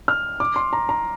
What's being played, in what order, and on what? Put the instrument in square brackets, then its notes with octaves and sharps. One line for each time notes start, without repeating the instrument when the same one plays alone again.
[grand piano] F6
D6
C6
A#5
A#5